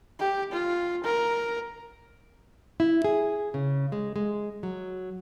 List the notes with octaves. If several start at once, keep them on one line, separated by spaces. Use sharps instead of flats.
G4
F4
A#4
E4
G#4
C#3
G#3
G#3
F#3